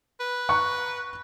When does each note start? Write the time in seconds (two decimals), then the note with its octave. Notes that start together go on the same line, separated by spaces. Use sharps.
0.20 B4
0.49 A#5 C#6 F#6